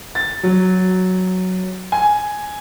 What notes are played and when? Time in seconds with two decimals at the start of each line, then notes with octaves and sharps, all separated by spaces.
0.15 A6
0.43 F#3
1.92 G#5